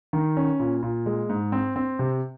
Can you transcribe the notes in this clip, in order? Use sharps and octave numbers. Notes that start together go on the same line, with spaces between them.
D#3
C#4
A#2
A#2
G#3
G#2
C4
C4
C3